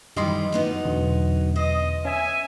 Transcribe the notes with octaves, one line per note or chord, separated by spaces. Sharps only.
F#2 D#3 E3 G3 D#5 C6
F#3 B3 D#4
E2 B2 D3
C5 D#5
C#4 E5 G#5